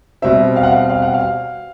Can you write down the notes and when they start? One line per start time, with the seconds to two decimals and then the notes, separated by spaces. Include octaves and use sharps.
0.22 B2 G3 C4 E5
0.56 F5
0.63 F#5
0.71 F5
0.90 F5
1.02 F#5
1.14 F5